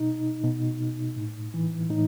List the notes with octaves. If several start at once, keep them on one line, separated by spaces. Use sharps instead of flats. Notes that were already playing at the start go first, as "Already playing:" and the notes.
Already playing: B2 D#4
B2
A2
E3
A2 D#4